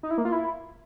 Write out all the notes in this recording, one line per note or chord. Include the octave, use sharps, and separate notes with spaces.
D#4
E4
A#3
F4
E4